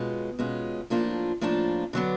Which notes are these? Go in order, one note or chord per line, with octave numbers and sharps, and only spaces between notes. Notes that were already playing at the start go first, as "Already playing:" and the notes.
Already playing: B2 G#3 C#4 F4
B2 G#3 C#4 F4
A2 F3 A#3 D4 F4
A2 F3 A#3 D4 F4
D3 F#3 B3 D4